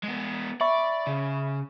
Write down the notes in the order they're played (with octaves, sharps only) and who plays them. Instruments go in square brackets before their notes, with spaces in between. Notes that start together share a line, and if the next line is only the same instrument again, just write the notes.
[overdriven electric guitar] G#3 B3
[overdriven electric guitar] D5 [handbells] E5 B5 C#6
[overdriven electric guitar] C#3